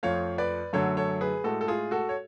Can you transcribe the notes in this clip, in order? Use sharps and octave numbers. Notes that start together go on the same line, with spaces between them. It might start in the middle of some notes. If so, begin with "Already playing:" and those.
F2 F3 A3 C#5 F5
B4 D5
F#2 D3 F#3 A3 A4 C#5
A4 C#5
G#4 B4
A2 G#3 F#4 A4
A4
F4 G#4
F#4 A4
C#5